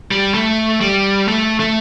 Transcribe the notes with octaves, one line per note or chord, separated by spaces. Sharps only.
G3
A3
G3
A3
A3